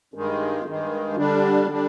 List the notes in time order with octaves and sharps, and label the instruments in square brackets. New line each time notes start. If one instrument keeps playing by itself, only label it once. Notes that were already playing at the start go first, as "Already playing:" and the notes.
[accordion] G2 D#3 G#3
G2 D#3 G#3
D3 G3 D4
D3 G3 D4